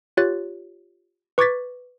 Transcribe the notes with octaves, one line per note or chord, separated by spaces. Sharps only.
F4 G4 C#5 F#6 A6
B4 C#6 D6 G#6 A6 B6